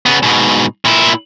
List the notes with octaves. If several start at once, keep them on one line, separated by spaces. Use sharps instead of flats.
C#3 B3
G#2 B2
A#2 E4